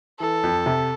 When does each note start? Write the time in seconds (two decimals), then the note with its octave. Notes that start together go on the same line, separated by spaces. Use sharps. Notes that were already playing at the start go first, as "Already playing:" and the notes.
0.20 E3 A4
0.43 F2
0.66 C3